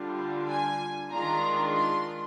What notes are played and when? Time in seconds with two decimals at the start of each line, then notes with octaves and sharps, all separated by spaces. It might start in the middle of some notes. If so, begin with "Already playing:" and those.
Already playing: D3 G3 D4 F4
0.49 G#5
1.12 D#3 G#3 D4 F4 A#5
1.77 C6